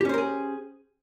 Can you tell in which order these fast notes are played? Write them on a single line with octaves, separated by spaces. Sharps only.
G4 C#4 C5 A#4 G#4